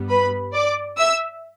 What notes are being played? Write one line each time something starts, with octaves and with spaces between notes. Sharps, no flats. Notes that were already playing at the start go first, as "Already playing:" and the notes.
Already playing: G2 G3 B3
B4 B5
D5 D6
E5 E6